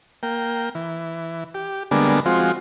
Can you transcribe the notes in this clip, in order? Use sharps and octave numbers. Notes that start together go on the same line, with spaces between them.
A#3 G5
E3
G4
D3 G3 G#3 A#3 B3 D4
F3 G#3 C4 F4 F#4